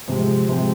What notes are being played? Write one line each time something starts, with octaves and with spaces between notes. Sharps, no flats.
C3 F3 G#3 C4
C3 F3 G#3 C4